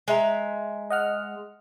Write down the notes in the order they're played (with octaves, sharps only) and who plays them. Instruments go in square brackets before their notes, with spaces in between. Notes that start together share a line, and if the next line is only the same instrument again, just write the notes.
[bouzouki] G#3 E5 A#5
[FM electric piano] D#5 F#5 F6